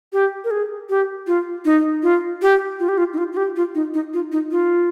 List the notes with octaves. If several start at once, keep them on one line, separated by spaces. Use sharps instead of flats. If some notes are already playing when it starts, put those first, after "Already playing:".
G4
A#4
G#4
G4
F4
D#4
F4
G4
F4
G4
F4
D#4
F4
F4
G4
F4
D#4
D#4
F4
D#4
F4